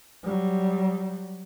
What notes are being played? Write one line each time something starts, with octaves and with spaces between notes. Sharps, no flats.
F#3 G3